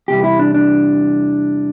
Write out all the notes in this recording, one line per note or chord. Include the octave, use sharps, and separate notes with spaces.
E2 C3 E3 G3 G4
E4
D4
D4